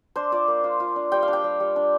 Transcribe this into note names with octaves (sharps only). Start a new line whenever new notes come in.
D4 C5
F4 D5
A#3
F4
F4
D4
G3 G5
F5
D4
G5
G3
G3
D4